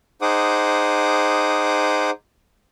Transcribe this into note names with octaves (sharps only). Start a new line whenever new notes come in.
D#4 G#4 C5 F#5 D6 D#6